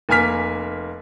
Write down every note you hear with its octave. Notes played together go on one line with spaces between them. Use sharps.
F1 A#3 G#5 F6 B6